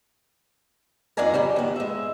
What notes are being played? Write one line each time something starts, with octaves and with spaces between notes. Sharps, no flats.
F2 D#3 D4 D5 G#5 A#5
C#3 G3 G4
D#2 B3
G#3 E5